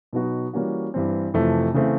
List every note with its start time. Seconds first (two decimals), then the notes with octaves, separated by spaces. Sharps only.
0.13 B2 F#3 B3 D#4 F#4
0.53 E3 G3 A#3 C#4 F#4
0.94 G2 E3 G3 C4
1.34 F2 C3 E3 A3
1.74 C#3 E3 A3 C4